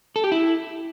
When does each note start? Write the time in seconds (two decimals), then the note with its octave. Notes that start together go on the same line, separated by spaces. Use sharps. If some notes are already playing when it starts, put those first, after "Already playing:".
0.16 A4
0.24 G4
0.32 E4